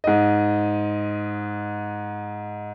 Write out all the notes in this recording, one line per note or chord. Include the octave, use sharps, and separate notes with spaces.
G#2 D#5